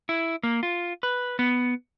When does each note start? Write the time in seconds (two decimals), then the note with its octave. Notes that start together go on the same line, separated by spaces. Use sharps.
0.09 E4
0.43 A#3
0.63 F4
1.03 B4
1.39 B3